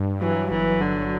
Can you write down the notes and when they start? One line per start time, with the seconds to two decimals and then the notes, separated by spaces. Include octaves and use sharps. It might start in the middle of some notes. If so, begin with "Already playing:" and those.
Already playing: G2
0.21 E3 F#3
0.50 G1 E3
0.81 D3 F#3